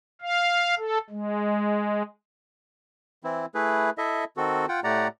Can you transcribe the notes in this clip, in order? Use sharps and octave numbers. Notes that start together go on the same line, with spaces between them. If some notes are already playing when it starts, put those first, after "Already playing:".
F5
A4
G#3
E3 C4 E4
A3 E4 G#4 B4
E4 A4 D#5 E5
D#3 C4 F#4 A4
F4 F#5 G5
A2 A3 G4 D5 F#5 A#5